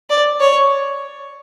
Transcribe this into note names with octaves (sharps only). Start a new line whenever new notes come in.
D5
C#5